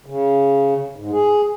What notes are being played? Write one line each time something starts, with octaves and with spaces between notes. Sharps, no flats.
C#3
G#2
G#4